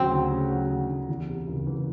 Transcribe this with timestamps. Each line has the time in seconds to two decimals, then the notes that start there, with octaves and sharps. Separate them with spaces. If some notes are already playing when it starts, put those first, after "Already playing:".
Already playing: D2 C#3 F#3 C4
0.12 D2
0.31 C#3
0.51 F#3
0.70 D2
0.89 D2
1.09 E2
1.28 C3
1.48 F#1
1.67 E3